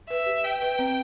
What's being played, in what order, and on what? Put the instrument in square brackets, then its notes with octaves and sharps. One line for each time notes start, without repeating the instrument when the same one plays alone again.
[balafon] B4 [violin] E5
[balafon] G4
[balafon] B4 [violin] G5
[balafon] B4
C4